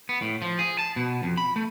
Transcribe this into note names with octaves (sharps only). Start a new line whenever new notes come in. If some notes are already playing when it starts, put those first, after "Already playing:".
B3
A2
F3
G#4
A5
B2
F2
B5
A3